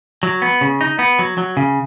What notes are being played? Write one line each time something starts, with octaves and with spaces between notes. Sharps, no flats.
F#3
B3
C#3
D#4
B3
F#3
F#3
C#3